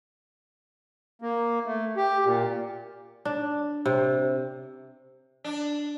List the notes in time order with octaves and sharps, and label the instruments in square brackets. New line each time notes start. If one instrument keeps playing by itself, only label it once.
[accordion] A#3
A3
G4
A#2
[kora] D4
C3
[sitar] D4